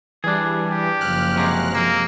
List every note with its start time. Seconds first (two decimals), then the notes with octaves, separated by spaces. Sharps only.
0.24 E3 G3 D4 G#4
0.72 G4
1.01 F#1 F3 F6 F#6
1.36 C3 F#3 G#3
1.75 F3 A#3 E6